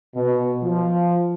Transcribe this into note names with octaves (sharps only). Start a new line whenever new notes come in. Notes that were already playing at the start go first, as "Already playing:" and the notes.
B2
F3